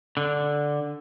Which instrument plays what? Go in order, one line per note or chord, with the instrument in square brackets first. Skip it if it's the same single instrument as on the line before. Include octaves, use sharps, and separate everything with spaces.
[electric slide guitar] D3